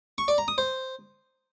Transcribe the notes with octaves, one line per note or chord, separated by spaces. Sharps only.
C#6
D5
A#5
D#6
C5